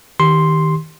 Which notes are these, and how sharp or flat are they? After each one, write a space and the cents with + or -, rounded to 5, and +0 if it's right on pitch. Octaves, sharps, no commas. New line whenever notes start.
D#3 +15 G4 +0 C6 +0